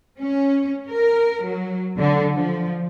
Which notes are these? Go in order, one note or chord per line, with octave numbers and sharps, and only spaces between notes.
C#4
A#4
F#3
D3
F3